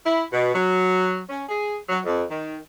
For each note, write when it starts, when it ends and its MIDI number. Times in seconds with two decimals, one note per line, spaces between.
0.04 0.23 64
0.31 0.53 47
0.53 1.20 54
1.28 1.42 61
1.48 1.76 68
1.89 1.98 54
2.05 2.23 41
2.30 2.57 51